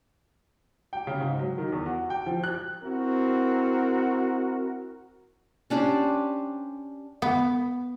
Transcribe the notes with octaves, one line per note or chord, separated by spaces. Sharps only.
G5
C#3
G#2
F#3
D#3
E2
F#4
G5
F3
F#6
C4 E4 F#4 A#4
C#4 D4 G4 C5
B3